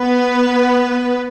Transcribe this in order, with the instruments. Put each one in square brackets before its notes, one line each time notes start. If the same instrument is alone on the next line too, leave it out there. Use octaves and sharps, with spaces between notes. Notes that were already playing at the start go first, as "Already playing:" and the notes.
Already playing: [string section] B3 B4